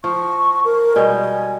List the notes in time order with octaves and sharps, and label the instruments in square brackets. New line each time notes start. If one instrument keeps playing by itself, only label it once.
[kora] F3 [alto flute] C#6
[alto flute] A#4
[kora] B2 G3 G#3 [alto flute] G#5